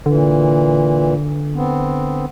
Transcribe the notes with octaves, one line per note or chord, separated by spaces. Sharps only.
A#2 D3 E3
B3 C4